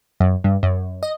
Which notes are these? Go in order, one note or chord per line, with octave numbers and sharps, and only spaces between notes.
F#2
G2
F#2
D#5